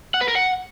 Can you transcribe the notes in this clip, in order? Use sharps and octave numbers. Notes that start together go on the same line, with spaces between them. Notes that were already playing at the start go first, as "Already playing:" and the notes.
F#5
B4
A#4
F#5